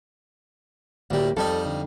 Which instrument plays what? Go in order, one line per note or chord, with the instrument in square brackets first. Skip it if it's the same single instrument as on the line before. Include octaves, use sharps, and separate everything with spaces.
[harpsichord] D2 G3 [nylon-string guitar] A2 A#3 G4
[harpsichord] F2 G3 D#4 [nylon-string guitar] A4
[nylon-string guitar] D3